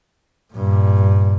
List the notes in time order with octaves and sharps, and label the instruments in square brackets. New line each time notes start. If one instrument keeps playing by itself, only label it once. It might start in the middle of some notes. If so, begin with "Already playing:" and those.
[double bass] G2 A#2